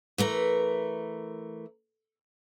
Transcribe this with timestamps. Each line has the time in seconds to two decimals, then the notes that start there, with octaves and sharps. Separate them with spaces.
0.18 E3 A3 A#4